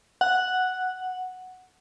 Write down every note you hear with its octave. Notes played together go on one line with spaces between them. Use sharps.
F#5